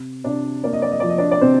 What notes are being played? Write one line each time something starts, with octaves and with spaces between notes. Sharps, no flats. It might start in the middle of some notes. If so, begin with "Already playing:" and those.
Already playing: C3
C3 D4 D5
A#3 D5
D#5
D5
D#5
F3 D5
D#5
D4 D5
D5
C3 C4 C5